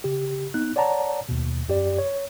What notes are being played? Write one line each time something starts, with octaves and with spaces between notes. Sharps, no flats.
C#3 G4
B3 D#4 F#6
C#5 D5 F#5 A5 A#5
D#2 B2
F#2 G4 D5
C#5